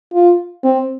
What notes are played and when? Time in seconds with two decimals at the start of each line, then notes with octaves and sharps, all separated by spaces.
0.14 F4
0.64 C4